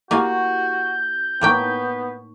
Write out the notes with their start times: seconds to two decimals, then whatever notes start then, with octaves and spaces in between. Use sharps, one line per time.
0.11 A#3 E4 F#4 G4 F5 F#5 G#5 G6
1.41 A2 A#3 B3 D#4 G5 C#6